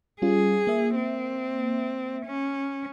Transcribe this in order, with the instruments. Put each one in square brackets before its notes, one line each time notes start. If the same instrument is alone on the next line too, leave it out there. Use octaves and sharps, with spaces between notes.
[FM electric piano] G3 C#4 F4 [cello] G#4
[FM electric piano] A#3 E5
[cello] C4
C#4